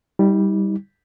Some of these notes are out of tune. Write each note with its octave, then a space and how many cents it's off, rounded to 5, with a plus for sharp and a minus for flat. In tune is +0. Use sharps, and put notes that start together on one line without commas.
G3 +0 D#4 +40